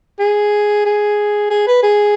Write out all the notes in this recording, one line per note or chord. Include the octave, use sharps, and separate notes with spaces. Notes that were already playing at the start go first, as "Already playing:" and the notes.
G#4
G#4
G#4
B4
G#4